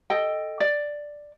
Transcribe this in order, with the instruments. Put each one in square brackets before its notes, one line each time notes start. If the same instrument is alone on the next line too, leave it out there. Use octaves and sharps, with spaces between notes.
[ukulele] A4 D#5 G5
D5